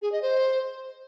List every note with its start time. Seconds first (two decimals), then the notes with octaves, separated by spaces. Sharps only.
0.02 G#4
0.12 D#5
0.22 C5